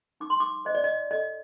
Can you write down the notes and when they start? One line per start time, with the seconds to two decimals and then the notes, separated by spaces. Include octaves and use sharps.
0.20 D#4 D6
0.30 C6
0.40 D6
0.65 C5 D#5
0.75 D5
0.84 D#5
1.11 A4 D#5